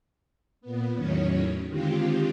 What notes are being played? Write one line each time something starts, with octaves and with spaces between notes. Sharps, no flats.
A#2 B3
E2 A2 D#3 F#3 C#4 C#5
D3 D#3 G#3 C4 F4 G4